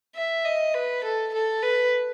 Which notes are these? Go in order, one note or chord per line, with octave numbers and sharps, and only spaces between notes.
E5
D#5
B4
A4
A4
B4